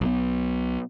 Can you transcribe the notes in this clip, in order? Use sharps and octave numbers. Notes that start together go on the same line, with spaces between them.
B1 B2